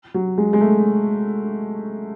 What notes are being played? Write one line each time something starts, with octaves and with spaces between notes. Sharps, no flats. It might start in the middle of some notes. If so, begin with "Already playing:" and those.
F#3
G#3
G#3
A3